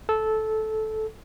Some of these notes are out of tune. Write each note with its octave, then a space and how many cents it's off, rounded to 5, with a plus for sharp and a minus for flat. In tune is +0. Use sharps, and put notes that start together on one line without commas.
A4 -15